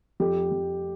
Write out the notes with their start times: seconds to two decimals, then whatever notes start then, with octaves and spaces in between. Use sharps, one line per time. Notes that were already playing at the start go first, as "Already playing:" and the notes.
0.20 F2 G4
0.52 F2